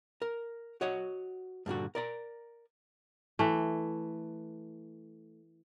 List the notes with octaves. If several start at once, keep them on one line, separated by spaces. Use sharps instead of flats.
A#4
F#4 C#5 D#5 F#5
G2 A#2 D3 F#4
A#4 D5 A#5
E3 A3